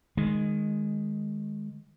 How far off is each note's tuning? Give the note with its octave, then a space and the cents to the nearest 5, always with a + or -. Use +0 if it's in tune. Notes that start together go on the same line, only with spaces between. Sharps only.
D#3 -10 G#3 +0